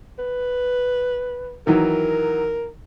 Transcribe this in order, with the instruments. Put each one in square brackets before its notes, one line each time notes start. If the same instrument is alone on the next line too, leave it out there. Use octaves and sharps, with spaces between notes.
[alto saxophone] B4
[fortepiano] D#3 E3 F#3 [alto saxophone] A#4